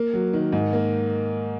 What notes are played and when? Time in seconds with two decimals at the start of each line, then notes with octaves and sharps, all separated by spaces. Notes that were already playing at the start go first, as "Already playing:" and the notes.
Already playing: A#3
0.14 F#3
0.33 D#3
0.52 G#2
0.73 A#3